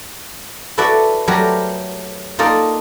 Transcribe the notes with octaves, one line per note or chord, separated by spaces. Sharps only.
E4 F#4 A4 B4 D5 E5
F#3 A3 G4 A#4 B4 D5
A#3 D#4 F4 A4 A#4 D5